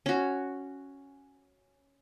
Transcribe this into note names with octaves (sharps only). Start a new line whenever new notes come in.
C#4 F#4